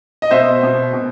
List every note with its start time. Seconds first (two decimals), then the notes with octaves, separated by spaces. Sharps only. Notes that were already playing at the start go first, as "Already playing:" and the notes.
0.22 D#5
0.31 B2 C5 E5
0.63 B2
0.93 B2